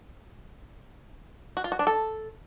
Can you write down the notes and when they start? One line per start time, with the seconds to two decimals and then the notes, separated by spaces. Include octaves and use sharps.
1.57 F#4
1.64 F4
1.72 F#4
1.79 D4
1.87 A4